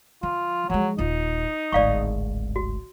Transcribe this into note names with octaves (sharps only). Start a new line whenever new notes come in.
F3 F4
F3 F#3 G#3
D#1 D#4 F4
D1 G#1 D5 F5 C#6
F#4